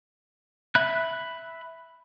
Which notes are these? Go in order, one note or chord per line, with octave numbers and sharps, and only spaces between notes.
E5 B5 F#6